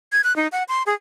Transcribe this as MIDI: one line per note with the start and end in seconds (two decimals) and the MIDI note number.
0.12 0.22 92
0.24 0.35 90
0.36 0.48 63
0.52 0.63 78
0.69 0.83 84
0.87 0.94 68